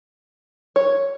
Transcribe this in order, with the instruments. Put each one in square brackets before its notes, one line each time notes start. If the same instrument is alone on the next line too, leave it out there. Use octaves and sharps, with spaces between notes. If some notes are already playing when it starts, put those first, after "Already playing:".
[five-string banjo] C#5